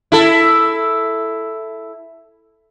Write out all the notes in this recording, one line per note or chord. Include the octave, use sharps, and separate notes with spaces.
E4 A4